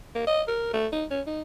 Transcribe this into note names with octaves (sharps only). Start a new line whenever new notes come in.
A#3
D#5
A#4
A3
D#4
C#4
D#4